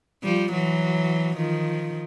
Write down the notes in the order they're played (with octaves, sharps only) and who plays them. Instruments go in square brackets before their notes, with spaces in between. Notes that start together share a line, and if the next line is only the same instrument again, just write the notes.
[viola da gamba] F3 G3
E3 F#3
D#3 F3